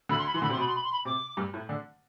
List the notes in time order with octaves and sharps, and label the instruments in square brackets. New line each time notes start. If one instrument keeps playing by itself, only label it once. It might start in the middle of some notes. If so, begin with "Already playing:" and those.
[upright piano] D2 D3 [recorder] B5
[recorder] C6
B5
[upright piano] E3 [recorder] C6
[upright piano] D3 [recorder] B5
[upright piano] C3 [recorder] C6
[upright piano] B2 [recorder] B5
[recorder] C6
B5
C6
B5
[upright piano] C3 [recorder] D6
[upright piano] G2 G3
A2 A3
D3 D4